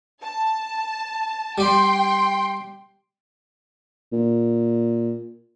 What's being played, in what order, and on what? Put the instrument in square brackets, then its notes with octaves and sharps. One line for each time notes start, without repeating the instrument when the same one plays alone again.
[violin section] A5
[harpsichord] G3 D5 [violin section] G5 C6
[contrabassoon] A#2